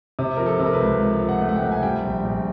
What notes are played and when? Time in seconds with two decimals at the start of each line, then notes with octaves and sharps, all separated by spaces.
0.19 C3
0.37 F3 A#4
0.46 A4
0.58 C3 A4
0.66 A#4
0.73 B4
0.80 C#2
1.01 F3
1.22 F3
1.29 F#5
1.42 A3
1.49 F#5
1.56 G5
1.62 C3
1.71 G#5
1.83 G3 G5
2.03 A#1
2.24 A#1